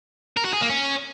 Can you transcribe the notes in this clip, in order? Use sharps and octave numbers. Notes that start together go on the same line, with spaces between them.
A#4
F#4
G#4
A#3
C#4